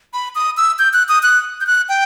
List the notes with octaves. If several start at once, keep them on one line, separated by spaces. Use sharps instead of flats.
B5
D#6
E6
G6
F#6
D#6
F#6
G6
F#6
G5